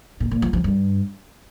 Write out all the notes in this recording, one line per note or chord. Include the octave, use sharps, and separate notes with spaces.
A#2
A#2
F3
F3
G2